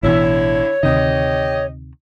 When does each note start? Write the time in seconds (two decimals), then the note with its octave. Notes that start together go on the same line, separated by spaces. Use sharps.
0.03 A1 B2 D3 E3 E4 C#5
0.83 D2 C3 D#3 G4 D#5